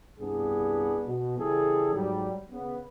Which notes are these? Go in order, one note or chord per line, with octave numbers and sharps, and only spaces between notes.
C2 G2 B3 D4 G#4
B2
C#3 E3 G3 G#4 A4
G#2 F#3 G3
C#3 B3